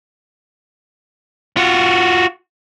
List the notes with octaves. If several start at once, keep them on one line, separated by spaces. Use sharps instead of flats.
F4 F#4